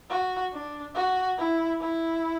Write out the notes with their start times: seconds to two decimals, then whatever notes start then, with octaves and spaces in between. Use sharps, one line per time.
0.09 F#4
0.53 D4
0.95 F#4
1.37 E4
1.80 E4